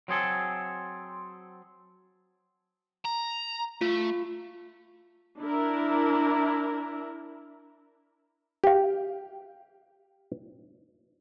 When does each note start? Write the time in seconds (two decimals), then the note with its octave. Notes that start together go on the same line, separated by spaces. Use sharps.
0.08 F#3 C4 G#4 A4
3.05 A#5
3.81 A3 F4
5.40 D4 E4 A#4
8.64 G4 F5